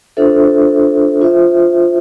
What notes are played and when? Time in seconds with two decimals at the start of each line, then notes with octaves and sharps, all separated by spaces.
0.17 D4 F4 A4 C5 E5
1.21 F4 C5 E5